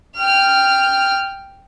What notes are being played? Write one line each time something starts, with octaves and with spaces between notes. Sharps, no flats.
G5 F6